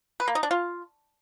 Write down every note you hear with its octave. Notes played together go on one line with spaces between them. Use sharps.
B4
A#3
D#4
D4
F4